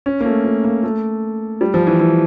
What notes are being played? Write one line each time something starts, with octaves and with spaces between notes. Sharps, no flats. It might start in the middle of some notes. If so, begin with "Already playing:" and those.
C#4
A#3
A3
A3
A#3
A3
G3
F3
E3
E3